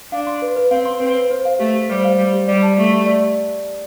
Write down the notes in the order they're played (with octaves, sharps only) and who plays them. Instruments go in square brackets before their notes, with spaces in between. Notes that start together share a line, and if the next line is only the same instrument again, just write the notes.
[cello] D4 [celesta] F5
[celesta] C6
B4
B4
[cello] C4 [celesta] F5
[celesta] C6
[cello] C4 [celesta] B4
[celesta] B4
C5
F5
[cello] A3 [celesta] G4
[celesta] G4
[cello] G3 [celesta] C5
[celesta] F5
[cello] G3 [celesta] G4
[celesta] G4
[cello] G3 [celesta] D5
[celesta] A5
[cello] A3 [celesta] G4
[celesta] G4
D5